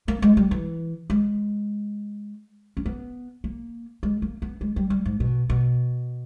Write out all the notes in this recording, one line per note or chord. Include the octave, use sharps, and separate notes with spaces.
A#3
G#3
G3
E3
G#3
C#4
B3
A#3
G#3
A#3
B3
G#3
G3
G3
G#2
B2
B2